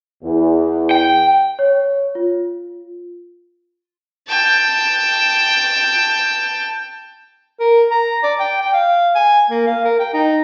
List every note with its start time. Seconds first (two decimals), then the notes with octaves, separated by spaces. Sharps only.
0.23 E2
0.91 G5
1.59 C#5
2.15 F4
4.28 G5 A5
7.60 A#4
7.91 A#5
8.23 D5
8.40 G5
8.61 G5
8.73 F5
9.15 G#5
9.50 A#3
9.67 F5
9.85 A#4
10.00 G5
10.14 D#4